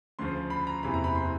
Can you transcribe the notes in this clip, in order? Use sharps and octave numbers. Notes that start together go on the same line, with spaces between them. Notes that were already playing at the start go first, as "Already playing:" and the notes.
D2 C#3 F3 C6
B5
A#5
F#1 E2 C3 E3 B5
A#5
B5
C6